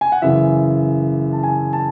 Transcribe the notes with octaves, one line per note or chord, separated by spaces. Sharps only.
G#5
F#5
F#2 C#3 E3 E5
A5
G#5
A5